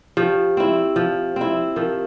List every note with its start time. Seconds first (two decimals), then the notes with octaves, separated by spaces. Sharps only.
0.17 F3 G4
0.57 C4 E4
0.96 F3
1.36 C4 E4
1.76 F3 G4 A#4